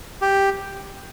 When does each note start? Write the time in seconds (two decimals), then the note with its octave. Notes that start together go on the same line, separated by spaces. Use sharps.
0.22 G4